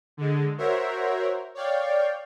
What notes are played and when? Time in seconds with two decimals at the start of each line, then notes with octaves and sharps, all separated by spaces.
0.17 D3 G#3
0.58 F#4 A#4 C5 C#5 E5
1.54 C#5 D5 F5 G5